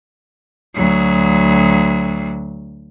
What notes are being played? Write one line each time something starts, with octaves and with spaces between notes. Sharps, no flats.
D2 F#3